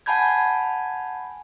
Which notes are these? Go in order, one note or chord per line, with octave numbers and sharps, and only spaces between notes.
F#5 G#5 A5 B5 G6 G#6